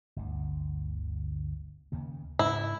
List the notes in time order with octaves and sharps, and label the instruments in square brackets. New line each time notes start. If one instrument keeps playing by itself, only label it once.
[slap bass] G1 D2
D#2 C#3 A#3
[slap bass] G#2 C#3 G#3 [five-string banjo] E4